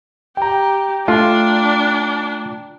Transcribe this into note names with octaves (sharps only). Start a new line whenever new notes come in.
G4 G5 A#5
A3 D4 F4